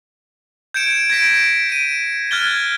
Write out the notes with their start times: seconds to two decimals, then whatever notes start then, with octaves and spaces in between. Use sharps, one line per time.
0.74 G6 G#6 C#7 D7 E7
1.10 G#6 A#6 B6 D7
1.70 D7 D#7
2.31 F6 F#6 G#6 A6 G7